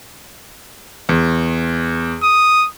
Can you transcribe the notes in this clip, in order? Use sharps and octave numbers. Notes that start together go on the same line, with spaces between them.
E2
D#6